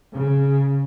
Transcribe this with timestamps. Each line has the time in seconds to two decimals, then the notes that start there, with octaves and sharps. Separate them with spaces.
0.13 C#3